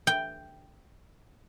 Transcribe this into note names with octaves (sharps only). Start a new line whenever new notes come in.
G5